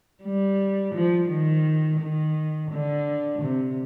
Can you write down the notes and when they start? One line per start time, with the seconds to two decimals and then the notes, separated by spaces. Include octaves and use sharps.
0.23 G3
0.95 F3
1.29 D#3
2.00 D#3
2.71 D3
3.42 C3